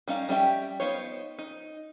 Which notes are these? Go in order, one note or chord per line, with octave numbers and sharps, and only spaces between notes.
G3 C#4 D#4 F5
G3 C#4 E5 G5
B3 D#4 F4 C5 C#5
D#4